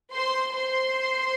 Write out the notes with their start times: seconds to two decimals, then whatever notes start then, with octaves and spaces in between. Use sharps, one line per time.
0.13 C5 C6
0.55 C5 C6